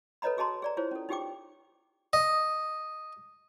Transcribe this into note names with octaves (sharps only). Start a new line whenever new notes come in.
A4 B4 C#5 D#5 A#5 B5
F#4 G#4 D#5 A5 A#5 C6
G#4 D5 A#5
E4 F4 G#4 C5 C#5
C#4 A4
D#4 F4 G4 G#4 G5 D6
D#5